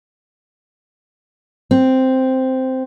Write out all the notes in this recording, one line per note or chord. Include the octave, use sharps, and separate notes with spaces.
C4